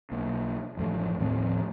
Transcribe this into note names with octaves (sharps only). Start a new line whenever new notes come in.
B1 A#3
A1 F#2 F3 A3
D#1 A2 F3 C4